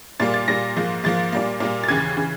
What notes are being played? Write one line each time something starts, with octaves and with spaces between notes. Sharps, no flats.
A#2 G3 A#3 A6
A6
A#2 G3 A#3 A#6
G#2 F3 A#3
G#2 F3 A#3 A6
A#2 G3 A#3
A#2 G3 A#3
A6
D#2 C#3 E3 G#6
C#3 E3